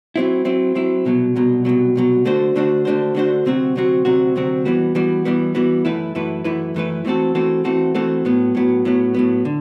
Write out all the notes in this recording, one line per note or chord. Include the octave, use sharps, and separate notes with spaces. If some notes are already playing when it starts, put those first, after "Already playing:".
F#3 C4 E4
F#3 C4 E4
F#3 C4 E4
C2 B2 F#3
C2 B2 F#3
C2 B2 F#3
C2 B2 F#3
D3 A3 D4 F#4 C5
D3 A3 D4 F#4 C5
D3 A3 D4 F#4 C5
D3 A3 D4 F#4 C5
D2 C3 F#3 C4 F#4
D2 C3 F#3 C4 F#4
D2 C3 F#3 C4 F#4
D2 C3 F#3 C4 F#4
E3 G3 B3 F#4
E3 G3 B3 F#4
E3 G3 B3 F#4
E3 G3 B3 F#4
F#2 E3 A3 E4 B4
F#2 E3 A3 E4 B4
F#2 E3 A3 E4 B4
F#2 E3 A3 E4 B4
E3 A3 C4 F#4 A4
E3 A3 C4 F#4 A4
E3 A3 C4 F#4 A4
E3 A3 C4 F#4 A4
A2 F#3 B3
A2 F#3 B3
A2 F#3 B3
A2 F#3 B3
D3